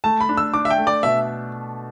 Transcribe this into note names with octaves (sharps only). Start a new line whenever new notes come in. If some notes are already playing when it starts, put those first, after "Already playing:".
A3 A5
B5
D4
E6
D4 D6
E5
G5
A3
D5
B2 E5